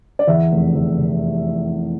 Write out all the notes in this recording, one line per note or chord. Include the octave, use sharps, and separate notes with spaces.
D5
E2 E5
F1
E2
C3